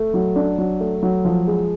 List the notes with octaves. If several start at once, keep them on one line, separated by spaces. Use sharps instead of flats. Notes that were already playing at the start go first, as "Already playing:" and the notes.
Already playing: A3
F#3
D4
F#3
A3
F#3
F3
G#3